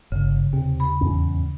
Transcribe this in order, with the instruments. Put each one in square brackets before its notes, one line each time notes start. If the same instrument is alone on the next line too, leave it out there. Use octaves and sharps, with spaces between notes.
[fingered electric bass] G1 [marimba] C#3
[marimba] D#2 [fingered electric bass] C3
[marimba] B5
[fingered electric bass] E2 G#2 C#4